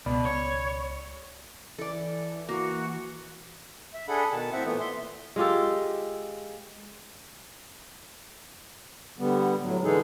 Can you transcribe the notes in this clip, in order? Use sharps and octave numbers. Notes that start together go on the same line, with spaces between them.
C#2 B2 D5 B5
C#5
E3 A4 D5
A#3 F#4
E5
D4 G#4 A4 F#5 B5
B2 D#3 A5
A2 C4 E5 F#5
A#2 E3 A3 B3
E5 C6
G#3 F4 G4 A4
D3 G3 B3
A2 F#3
D3 E3 G#3 D#4 G#4 A4